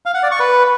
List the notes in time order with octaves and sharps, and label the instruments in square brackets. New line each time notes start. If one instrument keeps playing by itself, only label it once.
[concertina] F5
F#5
D5
C#6
B4